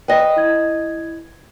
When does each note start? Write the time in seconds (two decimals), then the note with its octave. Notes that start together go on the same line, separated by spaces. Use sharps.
0.08 B4 D#5 G5
0.36 E4 G#6